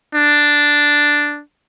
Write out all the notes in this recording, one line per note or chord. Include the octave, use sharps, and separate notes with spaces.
D4